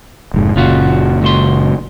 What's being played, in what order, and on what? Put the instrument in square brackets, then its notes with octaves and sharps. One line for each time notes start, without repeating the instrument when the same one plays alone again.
[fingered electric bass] F1 G#2
[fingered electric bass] F#1 A#2 [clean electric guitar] C#3 F4 F#4
[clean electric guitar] C#2 F#4 C6